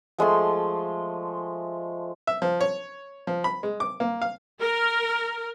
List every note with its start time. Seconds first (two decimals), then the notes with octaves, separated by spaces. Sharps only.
0.18 F3 G#3 A3 C6
2.27 E5
2.42 F3
2.61 C#5
3.27 F3
3.44 B5
3.63 G#3
3.80 D6
4.00 A#3
4.22 F5
4.61 A#4